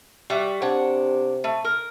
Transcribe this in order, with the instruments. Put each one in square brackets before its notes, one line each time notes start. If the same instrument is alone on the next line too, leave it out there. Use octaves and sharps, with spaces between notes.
[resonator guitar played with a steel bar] G3 F#4 E5
[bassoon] C3 [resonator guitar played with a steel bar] D4 C#5 F#5
[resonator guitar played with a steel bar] A3
A#4